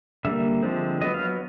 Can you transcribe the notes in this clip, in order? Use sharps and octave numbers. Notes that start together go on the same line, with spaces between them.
D3 G3 A#3 E5
D3 F3 G#3 C4
F#3 B3 D#5
F5